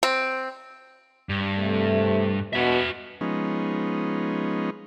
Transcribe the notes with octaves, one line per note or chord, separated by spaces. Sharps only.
C4
G2
C3 A3
B2 F#4 E5
F3 G#3 B3 C#4 D#4